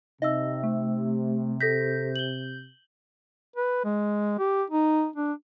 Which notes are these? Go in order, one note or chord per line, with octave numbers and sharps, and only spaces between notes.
C3 D#4 D#5 E5 E6
A3
A4 G6 A#6 B6
F#7 G7
B4
G#3
G4
D#4
D4